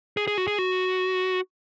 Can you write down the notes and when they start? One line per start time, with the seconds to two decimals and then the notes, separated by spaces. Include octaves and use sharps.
0.17 G#4
0.28 G#4
0.38 F#4
0.47 G#4
0.58 F#4